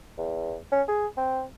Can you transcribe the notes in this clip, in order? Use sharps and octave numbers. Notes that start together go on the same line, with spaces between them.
E2
C#4
G#4
C4